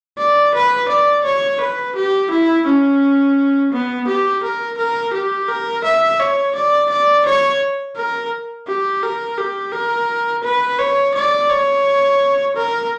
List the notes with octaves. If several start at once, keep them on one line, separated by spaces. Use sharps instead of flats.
D5
B4
D5
C#5
B4
G4
E4
C#4
B3
G4
A#4
A#4
G4
A#4
E5
C#5
D5
D5
C#5
A#4
G4
A#4
G4
A#4
B4
C#5
D5
C#5
A#4